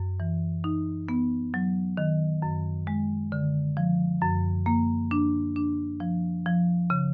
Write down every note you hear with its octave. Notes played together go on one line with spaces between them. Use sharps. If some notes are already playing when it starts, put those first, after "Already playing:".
Already playing: F#2
E3
D#4
B3
F#3
D#3
F#2
G#3
D3
F3
F#2
A#3
D4
D4
F3
F3
C#3